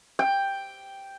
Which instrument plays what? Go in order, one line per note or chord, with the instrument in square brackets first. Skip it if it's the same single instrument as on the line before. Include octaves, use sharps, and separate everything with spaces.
[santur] G5